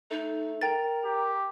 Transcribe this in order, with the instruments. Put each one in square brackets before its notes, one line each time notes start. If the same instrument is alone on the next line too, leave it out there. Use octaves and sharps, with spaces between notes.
[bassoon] A3 [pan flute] D#4
[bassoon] A#4 [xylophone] G5 A6 [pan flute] A#5
[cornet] G4